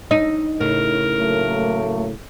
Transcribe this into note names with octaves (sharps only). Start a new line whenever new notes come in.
D#4
A2 C#3 A#4
F#3 A3 A#3